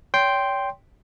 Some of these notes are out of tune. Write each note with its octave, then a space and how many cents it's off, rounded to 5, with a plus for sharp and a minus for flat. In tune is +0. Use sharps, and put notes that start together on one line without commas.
C#5 +35 G5 +0 C6 +0